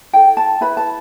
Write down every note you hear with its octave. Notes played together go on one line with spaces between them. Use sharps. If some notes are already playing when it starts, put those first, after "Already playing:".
E4 A4 G5
A5
E4 B4 B5
A5